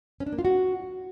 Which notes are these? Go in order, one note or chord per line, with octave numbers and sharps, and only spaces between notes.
C#4
D4
A#3
F4
F#4